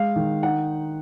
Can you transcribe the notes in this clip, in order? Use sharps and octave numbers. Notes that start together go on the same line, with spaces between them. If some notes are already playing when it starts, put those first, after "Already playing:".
Already playing: G#3 F5
D#3
D#4 F#5